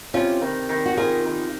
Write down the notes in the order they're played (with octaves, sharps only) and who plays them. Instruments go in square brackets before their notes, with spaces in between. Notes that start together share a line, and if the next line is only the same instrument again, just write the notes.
[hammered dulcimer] C3 [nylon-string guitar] C#4 F4
[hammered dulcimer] D#3
D#3
[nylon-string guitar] F#4
[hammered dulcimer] D#3 [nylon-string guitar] F4 G#4
[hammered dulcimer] D#3